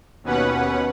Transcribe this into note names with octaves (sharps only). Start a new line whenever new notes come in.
D#2 B2 C#4 B4 F#5